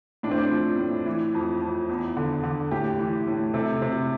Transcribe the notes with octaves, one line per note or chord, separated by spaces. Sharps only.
A2 D4
C4
D4
F3
A2
E3
F2
F2
E2
D3
D3
A2 G4
E3
A2
C3 A4
C3